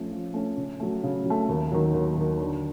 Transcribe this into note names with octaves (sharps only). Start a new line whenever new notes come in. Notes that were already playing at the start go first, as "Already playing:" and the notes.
Already playing: F3 A3 C#4
F3
A3 C#4
C#3
F#3 A3
C#3
F#3 A3
D#2
D#3 F#3
D#2
D#3 F#3
D3